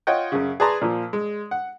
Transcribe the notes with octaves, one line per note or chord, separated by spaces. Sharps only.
F4 C#5 D#5 F#5 G5
F#2 C#3
G#4 B4 D5 A5 A#5 C6
A#2 F3
G#3
F#5